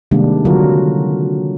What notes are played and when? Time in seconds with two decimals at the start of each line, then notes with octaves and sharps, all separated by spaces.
0.11 C3 D#3 G3 G#3 A#3 D4
0.45 D3 F#3 F4 F#4 A#4